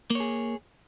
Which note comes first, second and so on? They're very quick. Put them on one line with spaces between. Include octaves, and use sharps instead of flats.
A#3 C#5 G#4